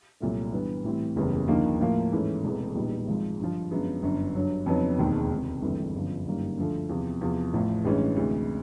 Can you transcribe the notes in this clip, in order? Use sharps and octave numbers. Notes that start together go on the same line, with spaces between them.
C2 A#2 F#3 A3
G2 E3 G3 B3
A2 E3 G3 C4
F#1 E2 C#3 E3 G3
D#2 D3 F3 A#3 D#4
A2 F3 A#3
G#2 E3 A3 C#4
E1 E2 C3 E3 A3
A#1 A#2 G3 B3 D#4
G#1 G#2 F3
G2 D3 F3
F#2 D3 F3 G#3 B3
G1 F#2 D3
G2 D3 F#3
F2 C#3 F#3 B3 D#4
E1 D#2 D#3 G#3 C4
C#2 C3 D#3
G1 G2 E3 A3 C4
G1 F#2 D3 F3
G1 F#2 D#3 G3 A#3
D2 D3 F3 A3
E2 C3 F3
E2 C3 F3
A1 A2 F3
A1 G2 E3 G#3 C#4
D2 C3 E3 G#3